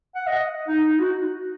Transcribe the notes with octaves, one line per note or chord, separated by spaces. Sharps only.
F#5
D#5
D#4
D#4
F#4